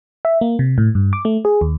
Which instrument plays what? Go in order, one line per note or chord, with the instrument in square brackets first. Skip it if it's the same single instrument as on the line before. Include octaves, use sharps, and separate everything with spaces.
[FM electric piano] E5
A#3
C3
A2
G2
D6
A3
G#4
D#2